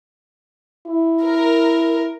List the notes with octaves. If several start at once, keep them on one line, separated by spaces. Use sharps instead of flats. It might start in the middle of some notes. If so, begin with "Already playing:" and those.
E4
A#4